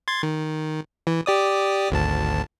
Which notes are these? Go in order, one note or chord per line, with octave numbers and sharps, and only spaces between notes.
C6 G#6 A6
D#3
E3
G4 D5 D#6
G#1 D2 A5